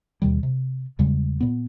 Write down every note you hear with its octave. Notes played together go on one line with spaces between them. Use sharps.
D#2 B2 D#3 G3
C3
E2 C#3 G3 G#3
A#2 B3